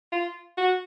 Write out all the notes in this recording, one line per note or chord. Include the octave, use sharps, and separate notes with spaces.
F4
F#4